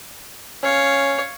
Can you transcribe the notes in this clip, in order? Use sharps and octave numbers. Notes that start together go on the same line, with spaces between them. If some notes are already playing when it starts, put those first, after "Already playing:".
C#4 C#5 F5